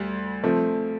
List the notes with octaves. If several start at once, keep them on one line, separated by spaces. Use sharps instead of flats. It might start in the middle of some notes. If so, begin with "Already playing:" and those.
Already playing: D2 G3
F3 A3 C4